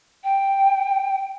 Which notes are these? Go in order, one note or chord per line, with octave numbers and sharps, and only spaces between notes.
G5